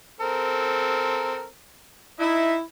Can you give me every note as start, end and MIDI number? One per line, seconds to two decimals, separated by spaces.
0.21 1.45 60
0.21 1.45 69
0.21 1.45 70
2.20 2.54 63
2.20 2.60 64
2.20 2.54 76